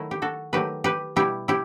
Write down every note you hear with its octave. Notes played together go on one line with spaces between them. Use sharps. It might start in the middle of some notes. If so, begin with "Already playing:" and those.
Already playing: D#3 F#3 A3 E4
G4
F#4 A4
D#3 F#3 A3 G4 B4
G4 B4
B2 G3 E4 G4
E4 G4